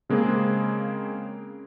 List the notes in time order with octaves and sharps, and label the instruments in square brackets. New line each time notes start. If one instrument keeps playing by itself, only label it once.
[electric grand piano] C#3 G#3 A#3 C4 G#4